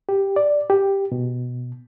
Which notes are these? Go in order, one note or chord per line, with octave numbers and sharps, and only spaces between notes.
G4
D5
G4
B2